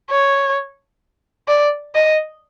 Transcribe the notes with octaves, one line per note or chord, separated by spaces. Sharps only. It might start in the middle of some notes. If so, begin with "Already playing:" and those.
C#5
D5
D#5